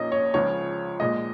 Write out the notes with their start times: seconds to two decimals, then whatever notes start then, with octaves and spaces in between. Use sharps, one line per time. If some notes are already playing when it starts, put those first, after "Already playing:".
Already playing: A#1 A#2 A#3 C#4 D#5
0.12 C#5
0.34 C#2 C#3 F3 C#4 C#5
1.00 A#1 A#2 G#3 D#5